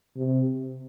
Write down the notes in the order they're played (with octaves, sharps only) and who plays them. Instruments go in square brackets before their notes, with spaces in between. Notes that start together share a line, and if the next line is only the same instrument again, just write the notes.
[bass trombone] C3